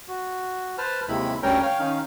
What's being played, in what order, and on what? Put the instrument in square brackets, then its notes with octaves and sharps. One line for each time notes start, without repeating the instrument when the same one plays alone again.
[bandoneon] F#4
B4 C5 A5 F6
D#2 C3 D#3 G#3 E4 B5
D2 G3 C#4 A#4 C#5 G5
C#5 F5 G5 F6
D#3 C#4 D#4 F5